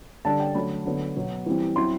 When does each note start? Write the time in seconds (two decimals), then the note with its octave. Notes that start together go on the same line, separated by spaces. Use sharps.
0.25 D3 G3 D4 A5
0.40 G5
0.54 D3 F#3 A3 B5
0.86 D3 F#3 B3
1.16 B2 F#3 B3
1.46 E3 G3 C4
1.76 F#3 C4 E4 C6